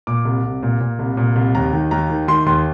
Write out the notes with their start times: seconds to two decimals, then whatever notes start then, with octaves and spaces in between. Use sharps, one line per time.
0.07 A#2 D6
0.25 C2
0.44 C2
0.63 A#2
0.80 A#2
0.99 C2
1.17 A#2
1.36 C2
1.55 D#2 A#5
1.73 D#3
1.91 D#2 A#5
2.10 D#3
2.28 D#3 C6
2.46 D#2 C6